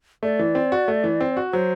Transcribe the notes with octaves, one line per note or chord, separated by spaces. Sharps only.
A3 D5
E3
C4
F#4
A3
E3
C4
F#4
F#3 C5